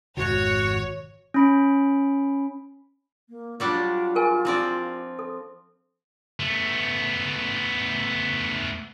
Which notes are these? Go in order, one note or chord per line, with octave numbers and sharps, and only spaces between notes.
G#1 F2 B2 F#4 C#5
C#4 B5 D7
A#3
F#3 G3 D4 F4
G#4 A#4 G#5
F3 C4 E4 D5
A4
A3 B3